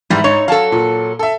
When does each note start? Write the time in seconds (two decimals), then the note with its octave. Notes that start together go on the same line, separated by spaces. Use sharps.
0.10 G#2 E3 G3
0.24 D#4 C#5
0.48 F#3 A4 F5 A5
0.72 A#2
1.19 A4 E5